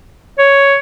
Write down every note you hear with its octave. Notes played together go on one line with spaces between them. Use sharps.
C#5